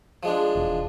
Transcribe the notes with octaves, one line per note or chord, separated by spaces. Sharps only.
F3 G#3 D4
E1